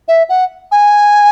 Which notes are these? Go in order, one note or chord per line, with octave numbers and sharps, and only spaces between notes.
E5
F#5
G#5